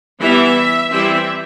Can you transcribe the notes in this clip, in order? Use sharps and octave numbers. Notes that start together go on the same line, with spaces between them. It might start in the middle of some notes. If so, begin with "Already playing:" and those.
E3 G3 B3 E4 E5
E3 G3 C4 E4 E5